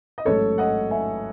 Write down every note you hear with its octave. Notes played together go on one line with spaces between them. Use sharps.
D#5
A1 G#2 F#3 A3 A4 C#5
D#5 F#5
E5 G#5